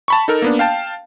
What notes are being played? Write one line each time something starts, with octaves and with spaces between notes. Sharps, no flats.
A5 B5 C#6
D#4 A4 A#4
A#3 B3 D4
F5 G5 A5